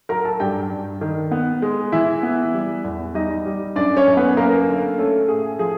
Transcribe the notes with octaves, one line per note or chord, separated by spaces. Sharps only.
F#3 A#4 A#5
A4 A5
G2 G4 G5
G2
D#3
B3
G#3
E3 E4 E5
B3
G3
E2
G3 D#4 D#5
G3
F#2 D4 D5
C#4 C#5
F#2
B3 B4
F#2 A#3 A#4
D3
A3 C#4 A4
A2 G#4
F3 G#4